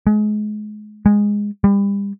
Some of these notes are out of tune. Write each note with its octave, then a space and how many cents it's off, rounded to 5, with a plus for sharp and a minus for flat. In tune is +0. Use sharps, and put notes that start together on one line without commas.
G#3 +30
G#3 -10
G3 +35